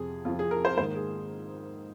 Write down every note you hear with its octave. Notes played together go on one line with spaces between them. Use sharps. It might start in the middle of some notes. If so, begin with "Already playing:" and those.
Already playing: F2 C3 F3 G#4
F2 C3 F3 F4
G#4
A#4
C5
G#2 D#3 A#3 C5
G#4